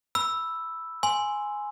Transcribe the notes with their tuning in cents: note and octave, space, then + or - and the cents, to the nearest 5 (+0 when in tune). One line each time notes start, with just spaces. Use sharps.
B5 +0 E6 +0
G#5 +0 C6 +0